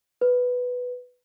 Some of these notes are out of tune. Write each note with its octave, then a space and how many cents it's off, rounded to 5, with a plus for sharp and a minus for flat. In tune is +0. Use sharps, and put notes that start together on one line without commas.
B4 +0